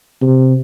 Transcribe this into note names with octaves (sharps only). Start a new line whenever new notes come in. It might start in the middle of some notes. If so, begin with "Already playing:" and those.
C3